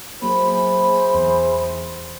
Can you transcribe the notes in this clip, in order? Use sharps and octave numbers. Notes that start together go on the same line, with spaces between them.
F#3 A#3 E4 G#4 C5 B5
E2